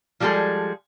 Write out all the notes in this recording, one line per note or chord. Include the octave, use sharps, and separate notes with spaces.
F3 G3 G#3 F#4 G#4 A4